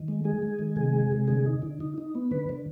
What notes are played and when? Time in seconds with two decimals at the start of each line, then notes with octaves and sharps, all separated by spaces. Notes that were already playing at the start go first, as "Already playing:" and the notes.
Already playing: D#3
0.08 G#3
0.24 G#3 G#4
0.42 G#3
0.59 D#3
0.76 C3 G#4
0.93 G#3
1.11 C3
1.28 D3 G#4
1.46 D#4
1.62 D3
1.80 D#4
1.98 D#4
2.15 B3
2.31 D3 B4
2.49 D3